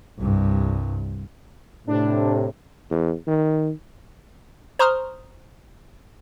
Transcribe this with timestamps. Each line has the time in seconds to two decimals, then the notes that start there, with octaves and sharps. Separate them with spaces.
0.18 C2 G2
1.87 A2 C3 D4
2.91 E2
3.27 D#3
4.79 C5 A#5 C6 C#6 D#6 F6